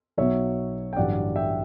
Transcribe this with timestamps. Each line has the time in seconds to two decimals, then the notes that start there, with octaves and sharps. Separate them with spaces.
0.17 B1 B2 F#3 C#5 E5
0.93 G5
0.96 A1 G2 D3 F#3 D5 F#5
1.36 E5 G5